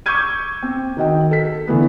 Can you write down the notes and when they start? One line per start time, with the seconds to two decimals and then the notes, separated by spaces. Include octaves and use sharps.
0.06 C#6 D6 E6 G6 G#6 D#7
0.63 C4
0.97 D#3 F#4 D#5 G5
1.31 A4 B6
1.67 D3 E3 A3 B3